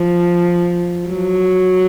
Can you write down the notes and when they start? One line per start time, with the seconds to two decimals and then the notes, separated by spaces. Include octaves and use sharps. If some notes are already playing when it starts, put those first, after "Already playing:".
Already playing: F3
1.07 F#3